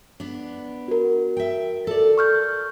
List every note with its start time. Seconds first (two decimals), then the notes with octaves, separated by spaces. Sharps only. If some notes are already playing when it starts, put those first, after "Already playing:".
0.20 B3 D4
0.88 F#4 A#4
1.37 E5 G5
1.87 A4 D5
2.18 C#6 F6 G6